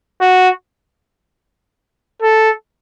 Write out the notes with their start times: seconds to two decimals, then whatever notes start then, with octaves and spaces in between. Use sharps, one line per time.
0.21 F#4
2.22 A4